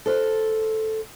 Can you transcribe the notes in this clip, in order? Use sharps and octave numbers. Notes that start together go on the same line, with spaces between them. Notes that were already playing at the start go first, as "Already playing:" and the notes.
A4 C5